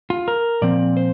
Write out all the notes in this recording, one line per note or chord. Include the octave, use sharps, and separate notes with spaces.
F4
A#4
A#2 F3 C4 D5
C5